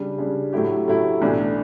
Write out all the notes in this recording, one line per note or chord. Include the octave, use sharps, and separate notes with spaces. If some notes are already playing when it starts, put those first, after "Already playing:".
Already playing: C#3 G3 D4
C#3 G3 D4
A2 F#3 A3 E4 G4
A2 F#3 A3 E4 G4
B1 A2 E3 A3 D4